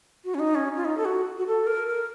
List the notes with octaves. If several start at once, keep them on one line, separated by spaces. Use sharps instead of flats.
F#4
C#4
D#4
C#4
F4
D#4
A4
F#4
F#4
A4
A#4
A#4